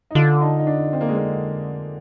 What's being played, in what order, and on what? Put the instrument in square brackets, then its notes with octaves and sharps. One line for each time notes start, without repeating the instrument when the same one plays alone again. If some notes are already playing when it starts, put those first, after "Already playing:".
[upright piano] D#4
[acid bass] D3 [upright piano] F4
[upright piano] D#4
D#4
D4
C4
A#3
G#3
A#3